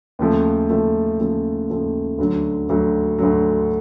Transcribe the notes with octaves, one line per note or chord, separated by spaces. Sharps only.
D#2 C#3 F3 A3
D#2 C#3 F3 A3
D#2 C#3 F3 A3
D#2 C#3 F3 A3
D2 D3 F#3
D2 D3 F#3
D2 D3 F#3